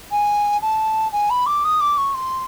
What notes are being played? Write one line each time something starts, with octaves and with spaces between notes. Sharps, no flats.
G#5
A5
G#5
B5
D6
D#6
D6
C#6
C6